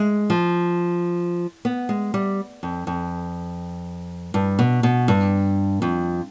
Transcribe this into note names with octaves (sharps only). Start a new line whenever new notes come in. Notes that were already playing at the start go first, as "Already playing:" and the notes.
Already playing: G#3
F3
B3
G#3
G3
F2
F2
G2
B2
B2
G2
F2